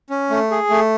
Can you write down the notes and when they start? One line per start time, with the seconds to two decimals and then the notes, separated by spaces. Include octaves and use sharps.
0.10 C#4
0.30 A3
0.51 G#4
0.70 A3